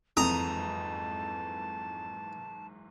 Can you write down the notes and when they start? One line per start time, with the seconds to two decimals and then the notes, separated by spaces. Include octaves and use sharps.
0.17 F#1 F2 G#2 E3 A5 A#5 D#6